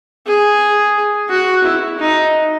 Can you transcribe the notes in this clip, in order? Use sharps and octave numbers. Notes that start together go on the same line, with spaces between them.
G#4
F#4
E4
D#4